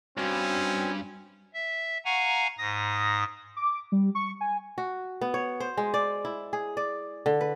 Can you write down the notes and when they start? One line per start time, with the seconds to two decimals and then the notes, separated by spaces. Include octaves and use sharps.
0.18 G2 C4 C#4 F#4
1.54 E5
2.05 F5 F#5 G#5 A#5 C#6
2.58 G#2 D#6 A#6
3.57 D6
3.92 G3
4.15 C#6
4.41 G#5
4.78 F#4
5.21 B3
5.34 C#5
5.60 C5
5.78 G#3
5.94 D5
6.25 E4
6.53 G#4
6.77 D5
7.26 D3
7.41 B4